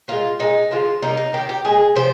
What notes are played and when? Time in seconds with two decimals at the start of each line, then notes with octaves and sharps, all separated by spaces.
0.08 A#2 G#3 F4
0.39 A#2 G#3 D#4
0.71 D3 F3 G#3 F4
1.02 C3 G3 A#3 D#4
1.17 D#4
1.33 D#3 A#3 G4
1.49 G4
1.65 A#2 G#3 G#4
1.96 C3 F3 C5